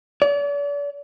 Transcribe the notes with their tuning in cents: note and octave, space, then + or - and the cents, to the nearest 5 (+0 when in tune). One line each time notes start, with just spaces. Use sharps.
D5 -40